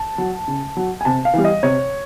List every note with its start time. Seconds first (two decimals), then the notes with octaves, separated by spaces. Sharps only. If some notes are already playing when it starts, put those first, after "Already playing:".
Already playing: A5
0.18 F#3
0.48 C#3
0.77 F#3
1.01 G#5
1.05 C3 A5
1.25 F5
1.34 E3 G3
1.44 D#5
1.63 C3 C#5